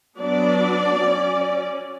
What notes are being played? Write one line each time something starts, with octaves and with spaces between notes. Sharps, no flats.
F#3 B3 D4 D5
F#3 C#4